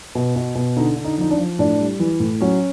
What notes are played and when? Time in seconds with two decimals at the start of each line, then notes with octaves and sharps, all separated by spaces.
0.15 B2
0.36 B2
0.55 B2
0.77 D3 D#4
0.96 D3
1.04 D#4
1.17 F3 D#4
1.31 D4
1.38 F3
1.59 A2 D4
1.80 G3
2.00 E3
2.20 A2
2.41 F#3 C#4